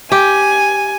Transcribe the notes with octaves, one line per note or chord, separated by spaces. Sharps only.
G4 G#5